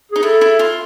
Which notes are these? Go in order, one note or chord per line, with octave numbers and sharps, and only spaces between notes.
D#4 G#4
E4 A4
E4
F4